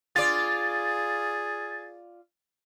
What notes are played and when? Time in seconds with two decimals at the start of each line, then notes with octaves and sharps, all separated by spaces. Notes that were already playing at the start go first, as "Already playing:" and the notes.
0.16 F4 G#4 D5 A6